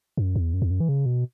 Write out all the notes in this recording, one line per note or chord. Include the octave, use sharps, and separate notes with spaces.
F#2
E2
F#2
E2
F#2
E3
C#3
B2